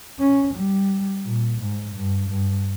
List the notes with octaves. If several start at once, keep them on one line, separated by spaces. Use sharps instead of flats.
C#4
G3
A#2
G#2
G2
G2